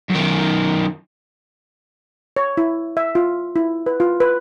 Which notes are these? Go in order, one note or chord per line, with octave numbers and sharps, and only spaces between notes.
F#2 D#3
C#5
E4
E5
F4
E4
B4
F4
B4